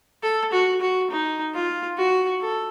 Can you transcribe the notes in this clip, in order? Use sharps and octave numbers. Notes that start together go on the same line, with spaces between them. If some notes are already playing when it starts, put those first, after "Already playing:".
A4
F#4
F#4
D#4
F4
F#4
A4